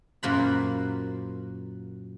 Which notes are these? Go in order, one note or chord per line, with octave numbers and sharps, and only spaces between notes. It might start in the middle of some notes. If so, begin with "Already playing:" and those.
F#2 A#2 A#3 F#4 C5 B5